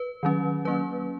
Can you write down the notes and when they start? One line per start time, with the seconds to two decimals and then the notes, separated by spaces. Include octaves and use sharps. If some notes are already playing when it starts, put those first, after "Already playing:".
Already playing: B4
0.23 D#3 F#3 C#4
0.65 F#3 A#3 C#4 B4